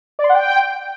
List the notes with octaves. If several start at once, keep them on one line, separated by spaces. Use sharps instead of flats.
D5
C6
F#5
G5